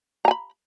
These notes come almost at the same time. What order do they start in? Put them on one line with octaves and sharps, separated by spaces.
A#5 G#5 B5